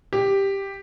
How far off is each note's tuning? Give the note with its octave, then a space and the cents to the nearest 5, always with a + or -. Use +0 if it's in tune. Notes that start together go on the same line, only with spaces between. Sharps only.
G4 +5